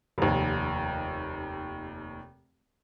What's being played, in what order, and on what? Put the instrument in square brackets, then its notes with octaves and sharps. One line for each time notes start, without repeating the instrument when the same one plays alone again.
[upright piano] F1 D#2